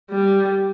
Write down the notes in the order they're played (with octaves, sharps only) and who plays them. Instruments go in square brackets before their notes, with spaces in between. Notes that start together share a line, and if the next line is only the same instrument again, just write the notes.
[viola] G3